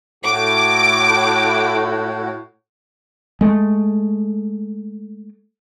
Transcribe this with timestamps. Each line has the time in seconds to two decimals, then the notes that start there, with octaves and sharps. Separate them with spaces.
0.24 A2 F#4 D6
3.41 G#3 A3